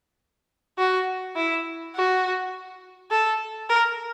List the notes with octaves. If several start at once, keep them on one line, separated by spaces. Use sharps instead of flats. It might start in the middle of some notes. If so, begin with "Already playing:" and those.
F#4
E4
F#4
A4
A#4